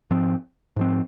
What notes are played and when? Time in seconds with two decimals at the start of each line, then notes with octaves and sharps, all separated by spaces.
0.11 G#2 F3 C4
0.76 G#2 F3 C4